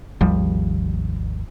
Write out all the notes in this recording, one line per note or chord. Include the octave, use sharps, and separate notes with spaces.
G#1 D#2 F3 G3